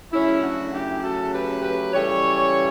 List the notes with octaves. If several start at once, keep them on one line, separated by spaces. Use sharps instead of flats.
C#3 F#3 A3 C#4 E4
D4 F#4
E4 G4
F#4 A4
G4 B4
G4 B4
C#3 E3 G3 A4 C#5